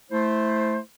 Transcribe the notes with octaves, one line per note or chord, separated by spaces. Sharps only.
A3 E4 C5